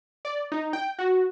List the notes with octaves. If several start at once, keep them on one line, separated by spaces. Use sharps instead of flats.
D5
D#4
G5
F#4